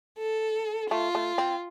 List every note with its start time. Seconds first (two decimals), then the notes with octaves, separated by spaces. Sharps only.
0.19 A4
0.90 A3 F4
1.15 A3
1.38 C4